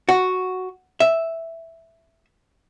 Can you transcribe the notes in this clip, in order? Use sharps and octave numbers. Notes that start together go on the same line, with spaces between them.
F#4
E5